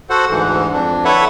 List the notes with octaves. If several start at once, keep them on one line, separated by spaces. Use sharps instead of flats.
F#4 A4 C5 F#5
D2 G#2 E3
F2 D4
E4 A4 B4 C#5 E5 F#5